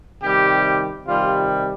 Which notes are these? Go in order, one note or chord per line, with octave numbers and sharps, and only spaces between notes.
C3 D#3 G3 G4
C3 D#3 G3 F4